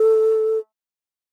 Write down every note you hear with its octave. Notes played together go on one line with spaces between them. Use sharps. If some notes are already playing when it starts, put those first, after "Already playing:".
Already playing: A4